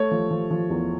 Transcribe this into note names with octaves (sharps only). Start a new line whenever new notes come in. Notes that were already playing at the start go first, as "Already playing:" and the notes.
Already playing: A3 C#5
F3
F3
F3
E2